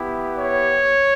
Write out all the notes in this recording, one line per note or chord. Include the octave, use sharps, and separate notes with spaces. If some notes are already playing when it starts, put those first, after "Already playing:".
Already playing: B3 E4 G4
C#5